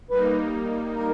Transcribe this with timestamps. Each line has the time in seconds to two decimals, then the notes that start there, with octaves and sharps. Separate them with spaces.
0.10 G3 A#3 D#4 B4
0.95 A#4